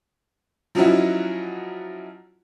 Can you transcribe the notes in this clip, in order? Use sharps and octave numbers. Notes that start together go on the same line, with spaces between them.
F3 F#3 C#4 D#4 E4 F#4